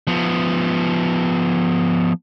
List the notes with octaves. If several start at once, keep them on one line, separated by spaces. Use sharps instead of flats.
F3 B3